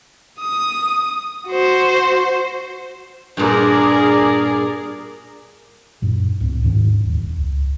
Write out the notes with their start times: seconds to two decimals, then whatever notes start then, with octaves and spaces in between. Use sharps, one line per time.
0.40 D#6
1.48 F#4 C5
3.37 G2 A#2 G#4 A#4 D5
6.02 F#2 A#2
6.40 C#2 A2 C4
6.63 D#2 G#2 D#3 C#4
7.03 D#1 E2
7.36 C#2